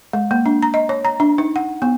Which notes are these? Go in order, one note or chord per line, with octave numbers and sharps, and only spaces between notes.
G#3
A#3
D4
A#5
D#5
C#5
A#5
D4
D#4
F#5
B3